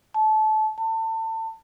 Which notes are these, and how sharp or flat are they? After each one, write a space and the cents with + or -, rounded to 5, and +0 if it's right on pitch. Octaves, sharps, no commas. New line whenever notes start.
A5 -25
A5 +30